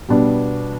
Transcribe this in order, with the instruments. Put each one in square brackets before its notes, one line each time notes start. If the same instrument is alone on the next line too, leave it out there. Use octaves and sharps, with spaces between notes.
[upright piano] B2 G3 B3 D4